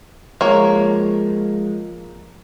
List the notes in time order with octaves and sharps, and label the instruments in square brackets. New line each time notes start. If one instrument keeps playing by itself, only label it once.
[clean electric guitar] F3 G#3 [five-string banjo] A#3 C#5